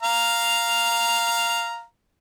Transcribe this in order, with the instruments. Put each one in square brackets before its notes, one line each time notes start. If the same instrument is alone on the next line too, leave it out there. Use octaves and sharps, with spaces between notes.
[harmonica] F5 A#5